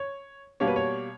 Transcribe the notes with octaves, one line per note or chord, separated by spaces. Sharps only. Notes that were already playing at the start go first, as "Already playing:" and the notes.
Already playing: C#5
B2 G3 A#3 C#5
B4
C#5